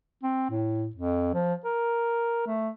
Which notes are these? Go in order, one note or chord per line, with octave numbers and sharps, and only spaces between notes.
C4
A2
F2
F3
A#4
A3